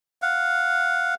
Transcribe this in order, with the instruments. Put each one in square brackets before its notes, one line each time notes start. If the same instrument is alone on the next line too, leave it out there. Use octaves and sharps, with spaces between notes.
[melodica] F5 F#5